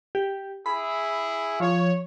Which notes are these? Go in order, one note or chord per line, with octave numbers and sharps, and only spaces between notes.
G4
E4 G#4 B5
F3 C#5